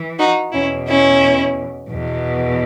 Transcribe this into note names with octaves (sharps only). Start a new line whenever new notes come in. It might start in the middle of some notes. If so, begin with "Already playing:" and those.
Already playing: E3
D#4 F#4
E2 B2 C#4 E4
C#4 E4
E2 B2